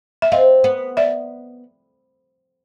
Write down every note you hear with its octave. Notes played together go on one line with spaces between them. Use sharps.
E5
C4 D#5 F5
B3
D5 E5